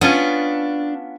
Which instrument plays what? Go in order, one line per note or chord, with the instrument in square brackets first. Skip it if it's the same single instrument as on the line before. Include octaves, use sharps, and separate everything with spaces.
[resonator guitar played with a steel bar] B3 C#4 F4 [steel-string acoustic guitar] D4